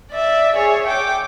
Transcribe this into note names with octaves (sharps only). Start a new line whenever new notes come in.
D5 E5
G#4 C#5
G5 D6